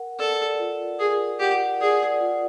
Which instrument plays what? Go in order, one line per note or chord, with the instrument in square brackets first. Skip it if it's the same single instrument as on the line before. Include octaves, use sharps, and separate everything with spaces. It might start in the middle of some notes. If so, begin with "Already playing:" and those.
Already playing: [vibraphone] A#4 F#5
[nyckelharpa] A4 [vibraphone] D5
[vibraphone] F4
[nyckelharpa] G#4 [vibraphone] A#4
[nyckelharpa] G4 [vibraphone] F#5
[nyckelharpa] G#4 [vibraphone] D5
[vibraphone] F4